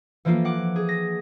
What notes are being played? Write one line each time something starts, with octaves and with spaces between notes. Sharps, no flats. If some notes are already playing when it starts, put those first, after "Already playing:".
E3 F3 A3 A#3 F4
F#5 D6
G#4
A#6